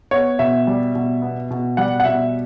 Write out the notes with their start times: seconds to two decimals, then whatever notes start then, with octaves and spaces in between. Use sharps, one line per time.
0.11 B3 C#5
0.39 B2 E5
0.67 G3
0.95 B2
1.22 B3
1.51 B2
1.77 G3 F#5
2.00 F#5
2.05 B2 E5